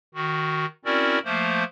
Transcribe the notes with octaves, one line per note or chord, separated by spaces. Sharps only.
D#3 F#4
C4 C#4 E4 F#4 A#4 D5
F3 A3 A#3 C5